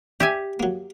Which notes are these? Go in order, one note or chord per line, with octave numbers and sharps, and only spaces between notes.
G4 D#5 E5 G#5
F#3 A#3